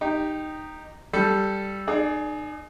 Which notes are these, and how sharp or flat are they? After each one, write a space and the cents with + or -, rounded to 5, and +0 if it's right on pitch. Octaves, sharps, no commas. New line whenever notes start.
D#4 -10 G4 +0
G3 +0 A4 +0
D#4 -40 G#4 +20 D5 +0